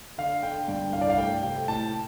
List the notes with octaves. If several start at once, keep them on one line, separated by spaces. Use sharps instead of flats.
D3 F5
D3 G5
G2 G5
C2 F5
D5
F5
A3 G5
C3 G5
A2 A5